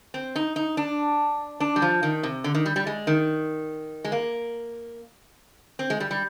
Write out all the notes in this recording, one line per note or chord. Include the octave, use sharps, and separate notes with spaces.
C4
D#4
D#4
D4
D4
G3
F3
D#3
C3
D3
D#3
G3
G3
G#3
D#3
G#3
A#3
C4
G#3
G3
G3